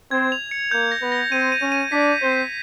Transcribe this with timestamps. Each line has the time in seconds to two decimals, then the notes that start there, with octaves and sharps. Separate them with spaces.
0.11 C4 C5 G#6
0.32 F7
0.51 C#7
0.71 A#3 A#4 G6
0.92 A#6
1.01 B3 B4
1.12 A#6
1.31 C4 C5 D#7
1.52 D#7
1.62 C#4 C#5
1.72 D#7
1.92 D4 D5 B6
2.12 G6
2.21 C4 C5
2.32 B6